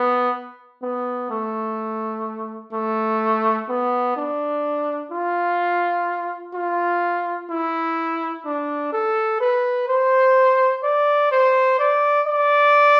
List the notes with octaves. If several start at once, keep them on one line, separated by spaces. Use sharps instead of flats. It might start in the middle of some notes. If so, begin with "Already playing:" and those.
Already playing: B3
B3
A3
A3
B3
D4
F4
F4
E4
D4
A4
B4
C5
D5
C5
D5
D5